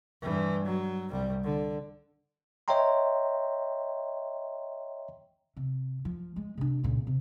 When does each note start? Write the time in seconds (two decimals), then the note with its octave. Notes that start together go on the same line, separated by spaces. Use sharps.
0.22 G2 E3
0.66 F#3
1.11 C2 G3
1.44 D3
2.68 C#5 D#5 E5 G5 A#5 C6
5.57 C3
6.05 F3
6.36 G#3
6.58 C3 D4
6.83 C#2 A#2
7.07 C3